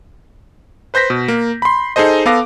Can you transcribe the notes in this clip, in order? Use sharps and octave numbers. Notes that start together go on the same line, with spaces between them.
B4 C5 G6 A#6 B6
B2
A#3
B5 C6
D#4 G#4 A4 C5 D#5
B3 A4 F5 D6 A#6